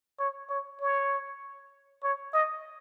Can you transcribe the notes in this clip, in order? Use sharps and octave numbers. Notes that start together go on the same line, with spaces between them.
C#5
C#5
C#5
C#5
D#5